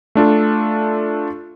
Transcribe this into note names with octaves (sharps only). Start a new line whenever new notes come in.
A3 D4 F4 A4